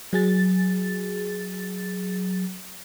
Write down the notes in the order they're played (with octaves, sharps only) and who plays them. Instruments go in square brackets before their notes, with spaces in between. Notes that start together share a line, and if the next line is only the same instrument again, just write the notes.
[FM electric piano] F#3 G#4 A6